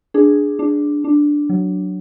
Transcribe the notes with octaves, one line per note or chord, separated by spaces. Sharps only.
D4 G#4
D4
D4
F#3